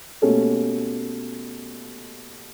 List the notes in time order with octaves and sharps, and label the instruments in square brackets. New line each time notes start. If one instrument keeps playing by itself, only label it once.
[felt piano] B2 A3 A#3 C#4 G4 A4